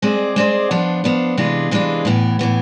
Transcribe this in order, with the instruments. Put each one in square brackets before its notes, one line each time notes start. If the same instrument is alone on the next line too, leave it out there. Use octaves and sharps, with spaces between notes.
[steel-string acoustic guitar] G#3 C4 G#4 D5
G#3 C4 G#4 D5
F3 B3 D4
F3 B3 D4
C3 E3 G#3 D4 F4
C3 E3 G#3 D4 F4
A2 E3 B3
A2 E3 B3